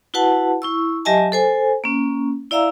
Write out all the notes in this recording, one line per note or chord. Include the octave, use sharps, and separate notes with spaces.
E4 F#4 B4 F#5 A5
E4 C#6 E6
F#3 G4 D#5 E5 G#5 A5
A4 C5 G#5
A#3 C#4
E4 D5 E5 F5 A#5 E6